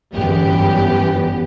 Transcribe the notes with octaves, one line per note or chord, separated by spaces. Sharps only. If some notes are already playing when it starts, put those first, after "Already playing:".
G1 F#2 E3 B3 G4